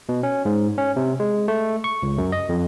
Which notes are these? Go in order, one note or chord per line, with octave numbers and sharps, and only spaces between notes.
B2
C#4
G#2
C#4
C3
G#3
A3
C#6
C#2
F#2
D#5
F2